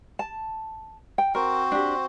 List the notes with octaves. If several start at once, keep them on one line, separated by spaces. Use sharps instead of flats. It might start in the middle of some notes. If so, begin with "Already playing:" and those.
A5
G5
C4 F#4 A#4 C5
D4 G4